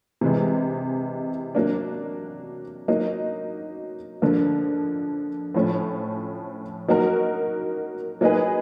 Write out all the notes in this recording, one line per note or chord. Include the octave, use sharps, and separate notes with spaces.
C3 E3 G#3
F#3 A#3 D4
F#3 A#3 D#4
D3 F3 A#3
A2 F3 A3 C#4
F#3 A#3 D#4 F#4 A#4
F#3 A#3 D#4 G#4 B4